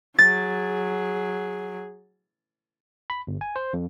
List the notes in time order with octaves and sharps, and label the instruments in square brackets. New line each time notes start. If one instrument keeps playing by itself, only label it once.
[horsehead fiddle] F#3 G#4 [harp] A6
[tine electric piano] B5
G1
G#5
C5
F2